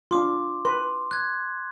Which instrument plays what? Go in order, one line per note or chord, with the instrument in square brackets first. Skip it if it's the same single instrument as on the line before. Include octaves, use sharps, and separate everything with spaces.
[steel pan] D4 F4 [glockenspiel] C6 D6
[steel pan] B4 [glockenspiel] C6
[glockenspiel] F#6 G#6